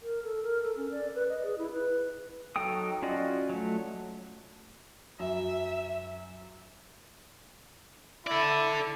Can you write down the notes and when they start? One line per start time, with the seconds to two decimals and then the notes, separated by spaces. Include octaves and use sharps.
0.02 A#4
0.23 A4
0.43 A#4
0.63 A4
0.77 C#4
0.91 D5
1.15 B4
1.29 D#5
1.43 G#4
1.58 E4
1.72 B4
2.56 F#3 D#4 A4 G5 D#6
3.02 C#4 F4 F#4 D5 D#5
3.49 F#3 A3
5.19 F#2 E5
8.27 E4 A4 D5